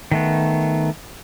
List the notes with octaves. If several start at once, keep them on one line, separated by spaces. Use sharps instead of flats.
D#3 A3 B3